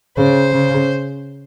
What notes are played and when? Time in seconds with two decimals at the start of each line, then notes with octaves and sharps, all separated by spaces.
0.17 C#3 C5
0.52 C#3